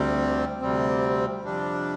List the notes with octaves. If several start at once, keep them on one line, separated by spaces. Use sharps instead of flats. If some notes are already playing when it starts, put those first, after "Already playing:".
Already playing: D2 C3 G3 C4
D2 C3 G3 C4
F2 C3 G3 D4